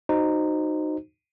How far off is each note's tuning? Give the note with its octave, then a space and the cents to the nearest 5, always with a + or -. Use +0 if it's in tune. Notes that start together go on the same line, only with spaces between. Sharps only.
D#4 -15 F#4 +5 C5 +0